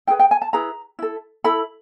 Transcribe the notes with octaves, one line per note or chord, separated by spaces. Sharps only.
E4 G#4 B4 G5
G5
G#5
A5
E4 G#4 B4 A#5
E4 A4
E4 A4 B5